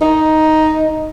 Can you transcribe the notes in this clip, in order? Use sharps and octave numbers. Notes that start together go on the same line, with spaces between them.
D#4